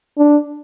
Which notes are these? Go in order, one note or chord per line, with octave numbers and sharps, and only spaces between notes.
D4